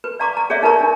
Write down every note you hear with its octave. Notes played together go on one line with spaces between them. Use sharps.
B4
D5 F5 A#5 C#6 D6
A#5
G#4 C#5 D5 E5 F5
D#4 A#4 B4 A#5 C#6
D4